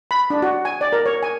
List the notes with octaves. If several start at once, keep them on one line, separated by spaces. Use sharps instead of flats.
B5
D4
F#4
G#5
D5
A#4
C#5
G#5